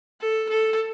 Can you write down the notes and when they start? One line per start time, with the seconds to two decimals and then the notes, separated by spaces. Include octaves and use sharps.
0.21 A4
0.49 A4